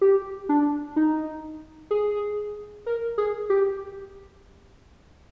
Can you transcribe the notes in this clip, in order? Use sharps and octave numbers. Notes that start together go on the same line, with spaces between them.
G4
D4
D#4
G#4
A#4
G#4
G4